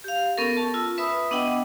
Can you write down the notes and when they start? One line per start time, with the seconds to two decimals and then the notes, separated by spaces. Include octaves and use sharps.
0.04 G4 F5
0.38 B3 C#4 A4 A#4
0.57 A5
0.74 F4 E6
0.98 B4 E5 B5 D#6 E6
1.31 B3 D4 D#5 F#5 G5